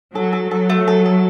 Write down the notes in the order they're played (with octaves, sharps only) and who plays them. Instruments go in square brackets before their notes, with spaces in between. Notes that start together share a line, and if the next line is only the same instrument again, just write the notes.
[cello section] F#3 [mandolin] A4
[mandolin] A4
[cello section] F#3 [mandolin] A4
[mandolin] A3
A4
A4